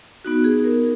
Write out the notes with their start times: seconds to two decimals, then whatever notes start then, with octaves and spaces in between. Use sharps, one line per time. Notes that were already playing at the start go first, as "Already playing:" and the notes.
0.25 B3 D#4 F#4
0.44 G#4
0.64 A#4